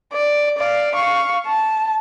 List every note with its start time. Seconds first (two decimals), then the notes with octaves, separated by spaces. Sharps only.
0.13 D5
0.58 D5 F5
0.93 F5 C#6
1.47 A5